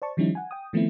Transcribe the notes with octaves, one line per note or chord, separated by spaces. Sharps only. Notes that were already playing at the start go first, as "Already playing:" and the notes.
C5 D5 A5 C#6
D#3 F3 G3 C#4 D#4 E4
F#5 G#5
G5 D#6
D#3 F3 A3 B3 C4 E4